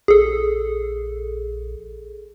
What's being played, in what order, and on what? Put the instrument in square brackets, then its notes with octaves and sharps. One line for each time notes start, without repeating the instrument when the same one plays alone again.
[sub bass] A#1 [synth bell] G#4 A4